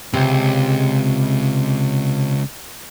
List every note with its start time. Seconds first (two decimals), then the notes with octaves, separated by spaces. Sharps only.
0.13 C#2 C3